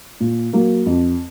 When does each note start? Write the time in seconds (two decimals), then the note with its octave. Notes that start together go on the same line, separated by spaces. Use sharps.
0.20 A#2
0.53 F#3 A#3
0.86 F2